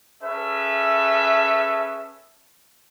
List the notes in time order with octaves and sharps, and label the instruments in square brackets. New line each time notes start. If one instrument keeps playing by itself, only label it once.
[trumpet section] C#4 G#4 A4 B4 E5